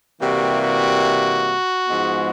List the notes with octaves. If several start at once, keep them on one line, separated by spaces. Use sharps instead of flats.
C3 E3 G3 A#3 F#4
F#4
G#2 F3 G#3 B3